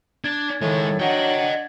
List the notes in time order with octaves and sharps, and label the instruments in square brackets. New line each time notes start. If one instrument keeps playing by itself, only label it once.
[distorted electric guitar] D4 [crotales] G#6 A6
[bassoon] A2 [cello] D#3 [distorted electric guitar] G#3 C#5
[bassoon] F#3 [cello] D4 F#5 [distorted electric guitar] D#5 G5